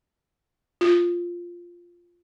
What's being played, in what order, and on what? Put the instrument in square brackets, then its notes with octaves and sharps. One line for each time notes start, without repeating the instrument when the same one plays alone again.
[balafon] F4